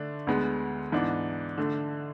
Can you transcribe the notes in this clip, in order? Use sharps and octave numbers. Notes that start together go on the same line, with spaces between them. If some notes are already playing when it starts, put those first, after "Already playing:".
Already playing: D3 A3 D4
D2 D3 G#3 B3
G#2 E3 B3 D4
D3 A3 D4